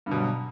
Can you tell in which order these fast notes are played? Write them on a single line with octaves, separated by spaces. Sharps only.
G2 D3 B2 G3 F#3